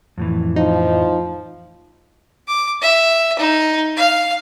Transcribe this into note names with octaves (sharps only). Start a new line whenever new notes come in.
F2 A2 E3
F3 D#4
D6
E5
D#4
F5